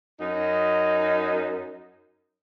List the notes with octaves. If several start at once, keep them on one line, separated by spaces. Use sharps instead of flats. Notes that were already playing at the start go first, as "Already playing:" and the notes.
F#2 D#4